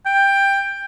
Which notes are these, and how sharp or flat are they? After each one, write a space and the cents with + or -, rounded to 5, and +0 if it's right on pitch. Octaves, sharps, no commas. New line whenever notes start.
G5 +15